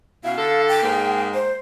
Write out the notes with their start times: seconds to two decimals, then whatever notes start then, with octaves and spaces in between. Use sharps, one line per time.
0.24 B2 C#4 E4 F5
0.38 D3 A4
0.68 G5
0.83 G#2 G#3 A#3
1.34 C5